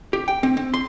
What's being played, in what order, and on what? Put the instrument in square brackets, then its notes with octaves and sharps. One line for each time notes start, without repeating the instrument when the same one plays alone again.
[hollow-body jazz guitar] G4
G5
C4
C4
C6